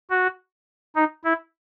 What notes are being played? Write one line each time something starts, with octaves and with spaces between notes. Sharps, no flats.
F#4
D#4
E4